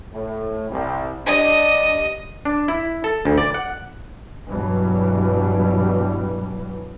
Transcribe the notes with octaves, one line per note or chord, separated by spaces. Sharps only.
A2
C2
G3 D4 D#5
D4
E4
A4
D2
D5
F#5
G2 B2 E3 F#3 G3